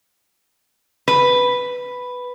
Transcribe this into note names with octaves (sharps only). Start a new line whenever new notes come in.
B4